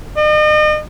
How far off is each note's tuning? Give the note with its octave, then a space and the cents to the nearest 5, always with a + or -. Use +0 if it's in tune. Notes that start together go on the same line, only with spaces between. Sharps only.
D#5 -40